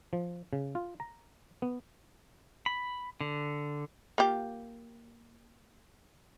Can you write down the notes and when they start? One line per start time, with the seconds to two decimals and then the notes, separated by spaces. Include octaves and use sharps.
0.13 F3
0.53 C#3
0.75 F4
1.00 A#5
1.62 B3
2.66 B5
3.21 D3
4.18 A#3 F4 G4